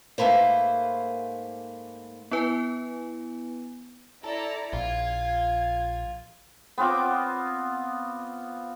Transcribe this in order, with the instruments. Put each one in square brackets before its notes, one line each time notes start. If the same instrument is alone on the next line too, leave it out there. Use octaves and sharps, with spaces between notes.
[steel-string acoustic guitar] G#2 A3 A#3 B4 C5
[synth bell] B3 E4 B4 G#5
[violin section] E4 D5 A#5 [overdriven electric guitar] A4
[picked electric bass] A#1 [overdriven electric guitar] F4 [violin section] G#6
[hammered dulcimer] B3 C4 F4 D6